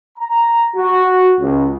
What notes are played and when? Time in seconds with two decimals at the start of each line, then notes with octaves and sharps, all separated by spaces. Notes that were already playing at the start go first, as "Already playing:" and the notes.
0.18 A#5
0.75 F#4
1.40 C#2